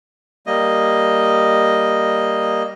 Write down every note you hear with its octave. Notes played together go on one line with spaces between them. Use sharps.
G3 A#3 D#5